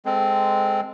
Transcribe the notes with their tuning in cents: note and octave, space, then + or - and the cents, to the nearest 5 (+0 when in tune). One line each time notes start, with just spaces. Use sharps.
G#3 +0 C4 -10 A4 +0